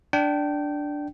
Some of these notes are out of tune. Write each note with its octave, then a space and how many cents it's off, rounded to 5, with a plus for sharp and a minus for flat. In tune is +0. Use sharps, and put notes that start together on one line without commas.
D4 +0 G5 -20